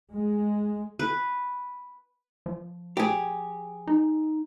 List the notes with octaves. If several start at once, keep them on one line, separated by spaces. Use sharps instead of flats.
G#3
B4
F3
G4 G#4
D#4